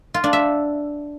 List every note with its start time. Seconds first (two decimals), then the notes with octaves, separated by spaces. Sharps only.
0.14 F4
0.24 D4
0.33 E5